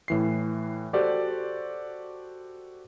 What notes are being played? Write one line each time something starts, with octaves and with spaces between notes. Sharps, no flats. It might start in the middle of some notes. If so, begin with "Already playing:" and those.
A2 E3 C7
F#4 G4 A4 C5 D5